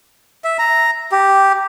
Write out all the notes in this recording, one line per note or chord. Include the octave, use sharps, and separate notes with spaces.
E5
A#5
G4